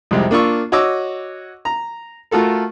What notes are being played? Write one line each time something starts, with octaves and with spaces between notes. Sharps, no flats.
C2 F2 C3 G#3
A#3 D4 F4 C#6 E6
F#4 C#5 D#5 D6 E6
A#5
A3 F4 F#4 A4 A#4